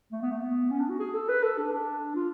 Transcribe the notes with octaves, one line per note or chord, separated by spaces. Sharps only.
A3
B3
A3
B3
C#4
D4
F#4
G#4
A4
B4
A4
D4
D4
F4